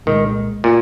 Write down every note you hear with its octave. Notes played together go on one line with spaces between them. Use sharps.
C2 A#2 D#3 G#3
A#2